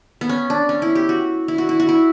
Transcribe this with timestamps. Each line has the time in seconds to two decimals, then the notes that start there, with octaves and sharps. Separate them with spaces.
0.21 B3
0.29 C#4
0.50 D4
0.69 C#4
0.82 E4
0.95 G4
1.09 F#4
1.48 E4
1.58 F#4
1.69 E4
1.80 F#4
1.89 E4